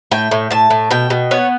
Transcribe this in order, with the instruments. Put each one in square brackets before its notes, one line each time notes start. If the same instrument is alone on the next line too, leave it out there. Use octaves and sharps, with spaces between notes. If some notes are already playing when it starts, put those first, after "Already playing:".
[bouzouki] A2 G5
A2
A2 A5
A2
B2 G5
B2
B3 C#5